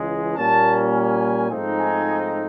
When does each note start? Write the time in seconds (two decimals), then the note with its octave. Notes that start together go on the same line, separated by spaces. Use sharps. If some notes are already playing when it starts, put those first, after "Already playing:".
Already playing: C#2 C#3 E3 G#3
0.36 A#2 G3 A#3 C#4 A5
0.93 G#5
1.50 G#2 F3 A3 C4 D#4
1.78 G#5